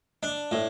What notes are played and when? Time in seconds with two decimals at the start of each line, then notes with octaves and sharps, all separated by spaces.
0.23 D4
0.52 A2